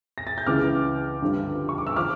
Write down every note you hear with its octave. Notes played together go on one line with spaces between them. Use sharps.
A#6
A6
G6
C#2 C#3 E3 D6 F6
G2 D3 F3
C#6
D6
E6
F3 D6 F6